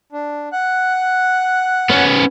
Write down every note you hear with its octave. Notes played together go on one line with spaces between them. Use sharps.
D4
F#5 F#6
B3 C#4